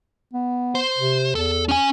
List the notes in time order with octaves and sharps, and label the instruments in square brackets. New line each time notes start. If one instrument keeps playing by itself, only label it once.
[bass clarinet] B3
[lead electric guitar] C5
[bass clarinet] C3
[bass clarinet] E2 [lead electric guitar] A4
[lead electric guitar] C#4 G#5